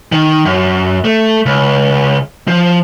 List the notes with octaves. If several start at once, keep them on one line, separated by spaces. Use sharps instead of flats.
D#3
F#2
A3
C#2
F3